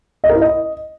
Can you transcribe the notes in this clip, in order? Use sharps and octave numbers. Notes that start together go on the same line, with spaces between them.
D#5
A#4
E4
D#5